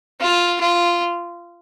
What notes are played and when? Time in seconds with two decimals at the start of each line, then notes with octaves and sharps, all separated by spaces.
0.20 F4
0.60 F4